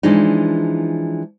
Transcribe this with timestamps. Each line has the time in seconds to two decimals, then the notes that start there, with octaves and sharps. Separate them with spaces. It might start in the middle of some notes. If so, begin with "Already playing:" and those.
0.03 E3 F3 G#3 D4 D#4